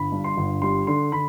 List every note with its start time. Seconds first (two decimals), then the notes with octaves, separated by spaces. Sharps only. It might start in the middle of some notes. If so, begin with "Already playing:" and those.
Already playing: G1 B5
0.12 G2
0.24 C6
0.37 G1
0.62 G3 C6
0.87 D3 C6
1.12 D3 B5